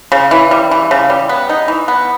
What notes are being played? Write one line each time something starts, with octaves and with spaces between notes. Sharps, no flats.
C#3
E3
G3
E3
C#3
G3
B3
D#4
E3
B3